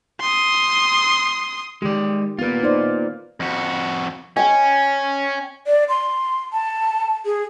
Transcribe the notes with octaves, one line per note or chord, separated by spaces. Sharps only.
C6 D#6
D#3 G#3 G4 D5
A#3 B3 F4 B4
D#4 C5 D5
F2 F#4
C#4 G5 G#5
D5
C6
A5
G#4